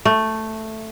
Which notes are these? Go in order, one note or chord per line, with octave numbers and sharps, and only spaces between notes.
A3